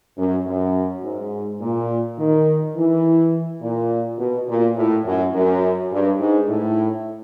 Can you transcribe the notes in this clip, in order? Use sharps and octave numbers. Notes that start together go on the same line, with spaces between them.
F#2
F#2
G#2
A#2
D#3
E3
A#2
B2
A#2
A2
F#2
F#2
G2
G#2
A2